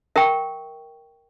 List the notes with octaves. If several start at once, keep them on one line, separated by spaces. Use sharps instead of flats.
A#4 E5 G5 C#6